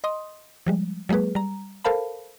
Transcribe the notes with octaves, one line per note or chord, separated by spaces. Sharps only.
D#5 C6 D#6
F3 G3 G#3
F#3 G#3 A#3 G#4 B4
G3 A#5
A4 A#4 C5 F5 A5 B5